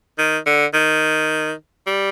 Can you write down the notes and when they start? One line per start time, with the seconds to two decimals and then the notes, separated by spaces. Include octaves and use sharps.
0.18 D#3
0.46 D3
0.74 D#3
1.87 G3